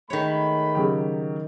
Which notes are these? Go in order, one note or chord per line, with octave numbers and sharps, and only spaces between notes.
D#3 G#3 A3 C#5 B5
C#3 F#3 G4